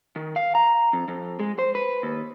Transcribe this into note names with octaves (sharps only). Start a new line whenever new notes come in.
D#3
F5
A#5
F2
F2
G#3
C5
B4
D#2